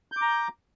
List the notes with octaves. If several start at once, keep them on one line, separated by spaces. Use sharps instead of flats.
A#5 D6 G6